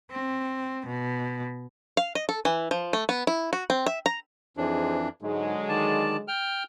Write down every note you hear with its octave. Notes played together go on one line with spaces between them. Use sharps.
C4
B2
F5
D#5
A4
E3
F3
A3
B3
E4
F#4
C4
E5
A#5
F2 E3 D4 D#4 G#4 C5
G#2 D3 F#3 G#3
D#3 D5 A5
G5 F6